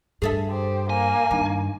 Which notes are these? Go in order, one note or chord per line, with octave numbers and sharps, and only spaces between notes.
G2 G#4 A4 E5
G4 C5
A#3 G#5
G2 D#3